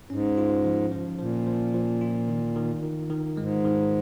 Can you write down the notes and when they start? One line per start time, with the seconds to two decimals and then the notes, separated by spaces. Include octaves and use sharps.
0.10 G#2 C#4
0.38 F4
0.65 F3
0.91 F3
1.19 A#2 F3
1.47 F3
1.74 F3
2.01 F4
2.28 D#3
2.56 D#3
2.83 D#3
3.10 D#3
3.37 G#2 G#3
3.65 D#3